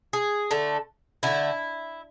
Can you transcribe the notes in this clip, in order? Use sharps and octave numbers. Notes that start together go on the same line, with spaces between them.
G#4
D3 A3
D3 A3 E4